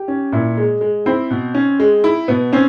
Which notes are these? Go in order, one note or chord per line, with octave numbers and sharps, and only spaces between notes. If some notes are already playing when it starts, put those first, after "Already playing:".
Already playing: G4
C#4
A#2 E4
G#3
G#3
C4 E4
B2
C#4
G#3
E4
B2 B3
C4 C#4